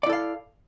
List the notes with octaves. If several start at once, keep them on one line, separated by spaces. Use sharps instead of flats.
E4 A4 D5 F5